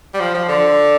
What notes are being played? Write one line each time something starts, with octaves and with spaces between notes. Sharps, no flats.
G3
F3
F3
D3